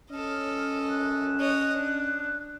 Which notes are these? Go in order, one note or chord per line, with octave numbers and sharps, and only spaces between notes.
C#4 A4 D#5 F6
F#6
C#5 D#5
D4